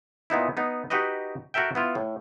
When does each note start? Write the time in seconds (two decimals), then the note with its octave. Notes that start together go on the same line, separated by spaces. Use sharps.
0.30 A#2 B3 D#4 E4
0.57 B3 D#4
0.90 D#4 F#4 G4 B4 D#5
1.54 F#4 A4 A#4 E5 G5
1.75 B3 E4 F4
1.95 A2